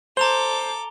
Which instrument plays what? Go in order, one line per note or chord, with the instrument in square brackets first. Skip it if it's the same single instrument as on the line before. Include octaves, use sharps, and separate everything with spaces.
[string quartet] A4 D6 [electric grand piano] C5 [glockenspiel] A#5 F7 G7